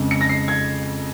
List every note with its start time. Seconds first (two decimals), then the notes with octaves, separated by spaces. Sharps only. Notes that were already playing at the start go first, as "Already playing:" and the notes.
Already playing: F2 C#3 G#3
0.11 C#7
0.21 A#6
0.29 C7
0.48 G#6